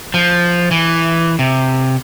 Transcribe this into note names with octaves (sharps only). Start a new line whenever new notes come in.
F3
E3
C3